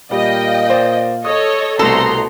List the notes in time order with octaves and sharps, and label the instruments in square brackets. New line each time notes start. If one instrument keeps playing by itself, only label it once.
[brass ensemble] A#2 F5 [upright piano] G3 [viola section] D#5 G5
[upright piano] C5 D5
[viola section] A4 C#5 D#5 [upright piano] D#6
[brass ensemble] C2 [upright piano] B2 A3 [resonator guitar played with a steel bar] A4 [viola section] A#5 C6